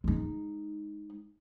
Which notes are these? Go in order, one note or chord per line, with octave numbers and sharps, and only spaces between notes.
G#3 D#4